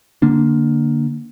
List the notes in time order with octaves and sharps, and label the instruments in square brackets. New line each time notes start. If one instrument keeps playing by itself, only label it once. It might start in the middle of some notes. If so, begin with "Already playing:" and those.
[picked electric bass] D3 A#3 D4